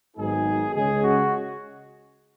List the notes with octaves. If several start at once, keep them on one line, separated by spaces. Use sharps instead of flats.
G#1 G#2 F#3 B3 D#4 G#4
C#2 C#3 G#3 C#4 G#4
F#4